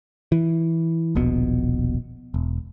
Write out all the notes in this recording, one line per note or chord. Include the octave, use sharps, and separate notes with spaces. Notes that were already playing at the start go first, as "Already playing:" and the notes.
E3
D#1 A#1 B2
E1